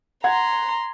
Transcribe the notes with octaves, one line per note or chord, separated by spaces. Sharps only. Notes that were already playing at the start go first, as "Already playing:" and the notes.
F#5 A#5 C6 G#6